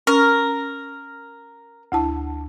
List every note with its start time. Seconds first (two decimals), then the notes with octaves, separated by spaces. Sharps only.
0.07 C#4 A#4
1.92 D2 E4 A5